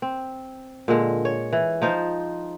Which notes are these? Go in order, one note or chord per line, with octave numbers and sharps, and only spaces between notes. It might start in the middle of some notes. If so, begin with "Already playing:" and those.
C4
A#2 D3 G#3
C#5
E3
F3 D#4 F4 C5